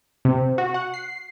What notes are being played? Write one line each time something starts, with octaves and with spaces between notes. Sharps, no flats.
C3
F#4
F#5
C7